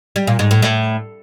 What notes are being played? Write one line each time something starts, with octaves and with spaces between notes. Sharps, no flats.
G3
A#2
G#2
A2
A2